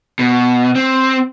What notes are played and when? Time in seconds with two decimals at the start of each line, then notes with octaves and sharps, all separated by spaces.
0.19 B2
0.76 C4